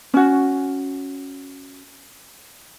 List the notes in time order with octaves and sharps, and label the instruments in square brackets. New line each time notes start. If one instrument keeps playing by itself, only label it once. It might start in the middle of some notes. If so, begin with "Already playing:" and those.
[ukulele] C#4 F#4